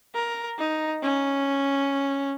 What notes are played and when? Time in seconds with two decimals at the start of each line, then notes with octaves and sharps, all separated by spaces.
0.14 A#4
0.59 D#4
1.03 C#4